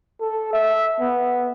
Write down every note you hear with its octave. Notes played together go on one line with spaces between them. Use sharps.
A4
E5
B3